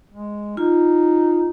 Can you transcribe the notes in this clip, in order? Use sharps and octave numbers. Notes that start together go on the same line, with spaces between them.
G#3
D#4 F4